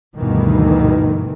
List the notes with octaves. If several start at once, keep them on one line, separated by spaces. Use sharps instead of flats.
D2 G2 B2 D#3 E3